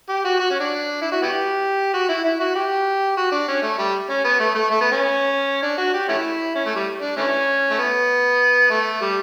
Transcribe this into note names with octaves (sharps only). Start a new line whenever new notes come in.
G4
F#4
F#4
C#4
D4
E4
F#4
B3 E4 G4
F#4
E4
E4
F#4
G4
F#4
D4
C#4
A3
G3
C#4
B3
A3
A3
A3
B3
C#4
D4
F#4
G4
A3 C#4 E4
C#4
A3
G3
D4
E3 A3 C#4
A3
B3
A3
G3